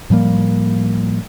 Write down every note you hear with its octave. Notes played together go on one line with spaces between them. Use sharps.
A2 F3 G3 A#3